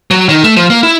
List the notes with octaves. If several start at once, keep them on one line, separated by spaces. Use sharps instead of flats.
F#3
D#3
A3
F3
A#3
E4